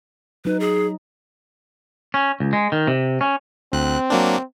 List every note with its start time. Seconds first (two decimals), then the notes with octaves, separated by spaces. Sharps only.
0.45 F#3 D#4 B4
0.60 G#4
2.14 C#4
2.40 C#2
2.53 G#3
2.72 D#3
2.87 C3
3.21 C#4
3.73 D2 C4 F#6
4.10 F#3 A#3 D4